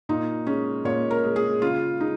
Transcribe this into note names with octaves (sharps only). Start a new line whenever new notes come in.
A#2 D#4
G#3 C#4
A#2 C#5
A#4
G#3
G#4
C#3 F4
G#3 D#4